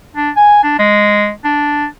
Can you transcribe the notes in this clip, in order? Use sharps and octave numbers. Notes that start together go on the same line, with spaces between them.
D4
G#5
D4
G#3
D4